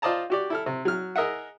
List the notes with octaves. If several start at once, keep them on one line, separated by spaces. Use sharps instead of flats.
F4 C5 D5 D#5 A5 A#5
F#4 G4 D5
E4 A4 F6
C3
F#3 F6
G#4 A#4 D#5 E5 F#5